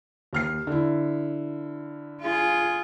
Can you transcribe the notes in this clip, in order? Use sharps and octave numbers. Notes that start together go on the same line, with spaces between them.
D#2 F6 C7
D3 E4
F4 G#4